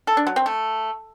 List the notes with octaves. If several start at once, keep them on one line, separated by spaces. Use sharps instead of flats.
A4
D4
F#3
C4
A3